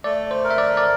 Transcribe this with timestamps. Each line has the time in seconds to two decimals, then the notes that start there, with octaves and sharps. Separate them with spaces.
0.04 A3 D5
0.31 C5
0.44 A#4
0.51 E5
0.58 D5
0.77 D5